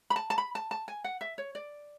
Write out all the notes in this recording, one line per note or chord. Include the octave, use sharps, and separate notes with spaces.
B5
A5
A5
B5
A5
A5
G#5
F#5
E5
C#5
D5